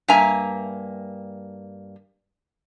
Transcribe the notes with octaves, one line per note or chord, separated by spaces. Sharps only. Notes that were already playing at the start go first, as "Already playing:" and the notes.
G2 A#3 E5 G#5 A#5